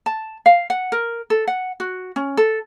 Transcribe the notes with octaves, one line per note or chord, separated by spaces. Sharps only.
A5
F5
F#5
A#4
A4
F#5
F#4
C#4
A4